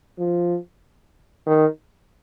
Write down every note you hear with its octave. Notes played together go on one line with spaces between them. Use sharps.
F3
D#3